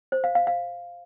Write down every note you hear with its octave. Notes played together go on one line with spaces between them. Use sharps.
C5
F5
F5
F5